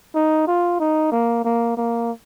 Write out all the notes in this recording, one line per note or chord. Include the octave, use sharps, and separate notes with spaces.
D#4
F4
D#4
A#3
A#3
A#3